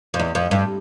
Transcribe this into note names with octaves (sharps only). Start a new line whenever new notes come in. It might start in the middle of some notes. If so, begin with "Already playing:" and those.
F2
E2
F2
G2